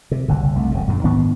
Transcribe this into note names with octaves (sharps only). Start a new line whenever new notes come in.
C3
F#1 C2 D3
C2 A3
E1 C#3
F#2 A#2 D3
G#2 D#3 B3 D4